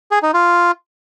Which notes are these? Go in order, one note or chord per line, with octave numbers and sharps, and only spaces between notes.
G#4
D#4
F4